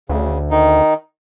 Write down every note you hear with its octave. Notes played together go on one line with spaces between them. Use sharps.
D2 C#3
D#3 D#4